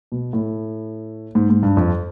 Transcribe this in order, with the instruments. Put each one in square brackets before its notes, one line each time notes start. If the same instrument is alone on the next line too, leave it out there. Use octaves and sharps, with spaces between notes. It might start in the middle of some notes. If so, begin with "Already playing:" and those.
[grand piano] B2
A2
G#2
G#2
G2
F2